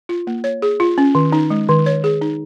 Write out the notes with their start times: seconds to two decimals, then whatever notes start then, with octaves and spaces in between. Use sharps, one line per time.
0.09 F4
0.27 A#3
0.44 C#5
0.62 G#4
0.80 F4
0.98 C#4
1.15 D#3
1.32 D#4
1.50 G#3
1.69 D#3
1.86 C#5
2.04 G#4
2.21 D#4